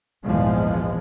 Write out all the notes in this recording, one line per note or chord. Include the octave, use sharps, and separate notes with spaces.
A#1 E2 G#2 F3 G#3